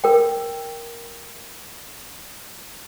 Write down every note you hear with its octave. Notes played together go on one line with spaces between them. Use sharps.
A#4 G5